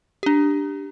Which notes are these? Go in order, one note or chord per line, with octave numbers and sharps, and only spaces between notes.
D4 G4